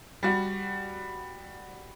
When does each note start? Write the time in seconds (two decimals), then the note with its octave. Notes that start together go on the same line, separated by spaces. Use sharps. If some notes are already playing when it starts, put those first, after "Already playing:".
0.23 G3 F#4